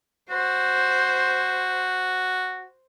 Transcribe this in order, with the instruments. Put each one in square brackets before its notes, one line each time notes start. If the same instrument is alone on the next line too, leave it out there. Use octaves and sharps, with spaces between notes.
[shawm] F#4 [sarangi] C5